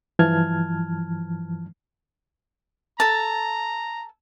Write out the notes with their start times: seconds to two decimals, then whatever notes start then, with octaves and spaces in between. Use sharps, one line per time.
0.19 G2 E3 F3 A5 F6 G#6
3.00 A4 A5 A#5